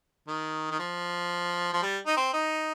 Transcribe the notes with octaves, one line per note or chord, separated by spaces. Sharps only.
D#3
D#3
F3
F3
G3
D#4
C4
D#4